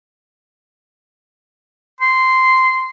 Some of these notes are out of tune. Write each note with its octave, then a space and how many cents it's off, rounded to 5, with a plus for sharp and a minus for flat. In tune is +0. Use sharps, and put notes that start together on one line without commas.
C6 -10